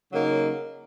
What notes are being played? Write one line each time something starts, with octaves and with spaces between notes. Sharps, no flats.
C#3 F#3 A#3 D#4